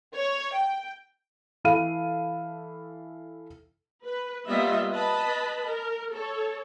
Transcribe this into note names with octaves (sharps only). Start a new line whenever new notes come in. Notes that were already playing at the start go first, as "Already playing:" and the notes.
C#5
G5
E3 E4 A4 F5 D#7
B4
G3 A#3 B3 F4 D#5 E5
B4 D#5 A5 B5
A#4
A4 C#5